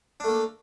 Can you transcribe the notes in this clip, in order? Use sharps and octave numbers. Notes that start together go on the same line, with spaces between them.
A3 A#3 D4